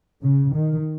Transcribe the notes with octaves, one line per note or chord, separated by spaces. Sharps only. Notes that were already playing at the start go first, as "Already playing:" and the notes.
C#3
D#3